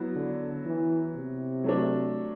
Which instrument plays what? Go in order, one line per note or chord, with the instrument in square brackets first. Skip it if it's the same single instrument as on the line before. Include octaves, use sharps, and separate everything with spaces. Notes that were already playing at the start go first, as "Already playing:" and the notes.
Already playing: [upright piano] F#3 B3 E4
[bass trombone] D3
E3
C3
[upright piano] F#3 A3 D4